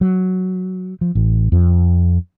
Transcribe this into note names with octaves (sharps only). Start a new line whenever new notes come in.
F#3
F3
A1
F2